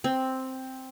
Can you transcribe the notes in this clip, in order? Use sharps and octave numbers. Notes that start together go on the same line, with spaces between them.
C4